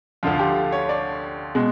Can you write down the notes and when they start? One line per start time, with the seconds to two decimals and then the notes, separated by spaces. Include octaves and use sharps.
0.23 D2 D3 F3 F4
0.39 G4
0.72 C#5
0.89 D5
1.55 B2 G#3